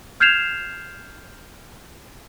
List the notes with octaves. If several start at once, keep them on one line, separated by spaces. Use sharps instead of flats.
F6 G6 G#6 C7 E7 F7